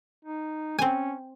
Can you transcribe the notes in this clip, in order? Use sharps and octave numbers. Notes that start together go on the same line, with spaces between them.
D#4
C4 C#4 G#5